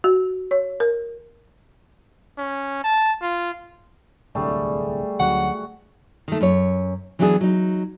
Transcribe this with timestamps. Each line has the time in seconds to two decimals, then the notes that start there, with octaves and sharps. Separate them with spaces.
0.04 F#4
0.51 C#5
0.80 A#4
2.37 C#4
2.84 A5
3.22 F4
4.35 D1 C2 D3 G3 A3 G#4
5.20 D2 F#3 C#4 F#4 F#5
6.28 D#3 A3
6.41 F#2 C#5
7.19 E3 F#3 B3 D4 G4 G#4
7.41 F#3 D#4